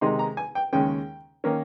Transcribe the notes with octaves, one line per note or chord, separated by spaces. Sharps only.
C3 D#3 G#3 D#4 C6
A#5
G#5
G5
D#2 C#3 G#3 C#4 G5
D#3 A#3 C#4